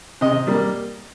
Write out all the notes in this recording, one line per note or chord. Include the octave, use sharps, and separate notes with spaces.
C3 D#5
G3 A#3